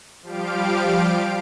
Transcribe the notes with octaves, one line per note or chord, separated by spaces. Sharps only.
F3 G3 G4 F5 D7